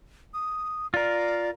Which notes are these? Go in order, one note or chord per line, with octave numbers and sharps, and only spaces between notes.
D#6
F4 A#4 D5